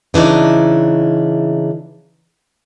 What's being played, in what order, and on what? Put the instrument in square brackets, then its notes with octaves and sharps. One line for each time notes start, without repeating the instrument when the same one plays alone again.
[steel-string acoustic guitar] C#3 E3 D4 D#4